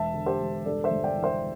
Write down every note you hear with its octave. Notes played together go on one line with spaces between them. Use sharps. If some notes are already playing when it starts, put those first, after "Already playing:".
Already playing: E1 E5 A5
D3
G4 C5
E1
G2 A4 D5
C5 E5
G1
D5 G5
E3
C5 E5